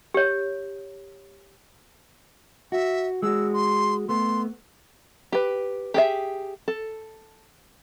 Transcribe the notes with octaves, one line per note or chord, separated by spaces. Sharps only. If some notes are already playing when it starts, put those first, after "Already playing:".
G4 C#5
F#4 E5
G#3 F#4 E6
C6
A3 B3 C6
G4 B4
G4 G#4 E5
A4